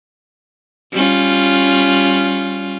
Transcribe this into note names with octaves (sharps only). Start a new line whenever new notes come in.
G3 C#4 F4